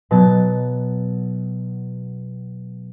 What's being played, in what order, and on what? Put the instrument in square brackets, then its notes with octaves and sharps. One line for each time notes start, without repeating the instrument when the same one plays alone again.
[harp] B2 F#3 A6